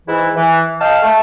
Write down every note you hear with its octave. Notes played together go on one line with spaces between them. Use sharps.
G#2 E3 E4
E3
D#5 F5 G5 A5
A3 A5